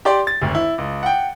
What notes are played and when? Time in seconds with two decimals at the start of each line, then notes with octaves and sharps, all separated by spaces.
0.05 G4 D5 C6
0.27 A6
0.42 G#1 D2
0.55 E4
0.78 C#2
1.03 F#5 G5